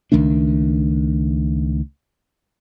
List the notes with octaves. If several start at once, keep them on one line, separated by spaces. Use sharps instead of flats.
C#2 D#3 A3 D4